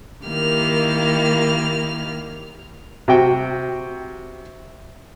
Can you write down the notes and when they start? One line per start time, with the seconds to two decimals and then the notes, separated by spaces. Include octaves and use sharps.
0.25 D#3 A#3 E4 G4 F6
3.08 C3 F#4 G5